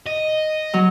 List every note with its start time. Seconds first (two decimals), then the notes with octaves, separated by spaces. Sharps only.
0.06 D#5
0.74 F#3